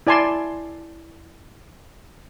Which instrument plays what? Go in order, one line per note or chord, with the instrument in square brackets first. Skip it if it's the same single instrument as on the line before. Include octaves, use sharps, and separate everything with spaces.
[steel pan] E4 D5 G#5 A5 C6